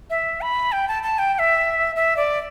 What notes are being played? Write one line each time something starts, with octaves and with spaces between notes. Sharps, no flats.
E5
B5
G5
A5
A5
G5
G5
E5
E5
D5